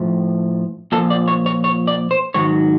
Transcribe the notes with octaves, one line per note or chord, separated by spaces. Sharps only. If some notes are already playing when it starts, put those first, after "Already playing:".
Already playing: A2 F3
A#2 F3 A4
D5
C#5
C#5
C#5
D5
C5
G#2 D#3 F#3 C#5